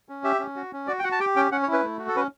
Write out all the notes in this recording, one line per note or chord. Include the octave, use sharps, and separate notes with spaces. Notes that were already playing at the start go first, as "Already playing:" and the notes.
C#4
G4 E5
C#4
F#4
C#4
F#4 D5
G5
F#4 F#5
A5
G4 G5
C#4 G5
C#4 F#5
C#5
E4
B4
A3
F#4
A4
C#4 B4